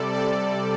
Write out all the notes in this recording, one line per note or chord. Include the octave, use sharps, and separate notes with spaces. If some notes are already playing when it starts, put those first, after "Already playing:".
Already playing: C3 G3 A4 D5
A4 D5